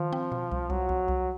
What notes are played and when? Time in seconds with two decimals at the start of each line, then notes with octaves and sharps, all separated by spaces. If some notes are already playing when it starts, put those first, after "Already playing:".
Already playing: D#3 F3
0.13 C4
0.32 B2
0.51 C2
0.70 C2 F#3
0.89 C2
1.08 C2